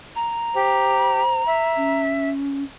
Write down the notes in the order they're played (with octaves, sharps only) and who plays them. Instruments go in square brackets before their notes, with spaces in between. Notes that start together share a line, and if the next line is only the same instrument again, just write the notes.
[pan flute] A#5
[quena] G4 [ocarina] C5
[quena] E5
[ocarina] C#4